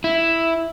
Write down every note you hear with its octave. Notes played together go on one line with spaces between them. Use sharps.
E4